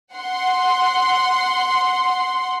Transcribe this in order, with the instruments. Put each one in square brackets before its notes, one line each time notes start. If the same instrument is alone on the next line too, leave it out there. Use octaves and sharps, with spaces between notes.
[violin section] F#5 C6